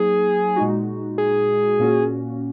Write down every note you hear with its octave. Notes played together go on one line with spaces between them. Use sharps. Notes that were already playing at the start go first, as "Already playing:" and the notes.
Already playing: F#3 A#3 D#4 G#4
A#2 G#3 D#4 F#4
G#4
A#2 A#3 C#4 F#4